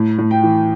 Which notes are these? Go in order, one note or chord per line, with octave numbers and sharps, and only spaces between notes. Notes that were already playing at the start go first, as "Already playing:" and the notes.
Already playing: A2
A2
G5
E3